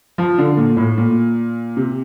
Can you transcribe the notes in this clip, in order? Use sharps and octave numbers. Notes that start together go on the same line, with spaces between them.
F3
D3
A#2
A2
A#2
C3